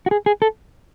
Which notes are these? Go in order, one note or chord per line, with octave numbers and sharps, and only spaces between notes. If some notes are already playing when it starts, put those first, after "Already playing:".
F#4
G#4
G#4
A4